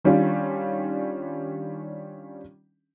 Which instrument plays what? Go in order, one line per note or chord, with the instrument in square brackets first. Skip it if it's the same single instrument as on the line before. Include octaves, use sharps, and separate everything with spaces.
[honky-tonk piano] D#3 G3 C#4 D4 F4